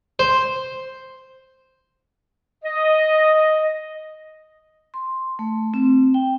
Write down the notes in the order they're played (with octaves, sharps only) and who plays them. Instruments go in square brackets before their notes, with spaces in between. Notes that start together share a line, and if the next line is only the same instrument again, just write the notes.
[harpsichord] C5
[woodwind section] D#5
[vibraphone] C6
A3
C4
G5